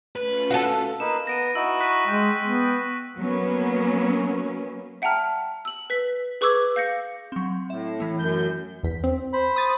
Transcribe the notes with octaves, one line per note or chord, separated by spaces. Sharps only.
A3 C#4 F4 B4
F#4 A4 F5 F#5 A5
A#3 D#4 B4 E7
B3 A#6 D7 D#7
D#4 E4 F#4 E6
C#6 F#6 B6
G#3 G5
B3
F#3 A#3 B3 C#4
E5 F#5 G5 A5 A#5 F6
E6 F#7
B4 B6
G#4 B4 C#6 D6 E6 G#6
F5 G6 A#6 C#7
F#3 C4
A2 E5
E3 A3
F#2 G6
E2 B6
C4
C5 B5
D#6 A6